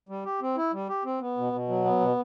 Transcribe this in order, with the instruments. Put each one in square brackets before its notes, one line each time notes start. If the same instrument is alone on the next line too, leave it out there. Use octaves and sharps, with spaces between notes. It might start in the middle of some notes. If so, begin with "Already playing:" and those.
[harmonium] G3
G4
C4
E4
G3
G4
C4
B3
B2
B2
F#3
B3
B2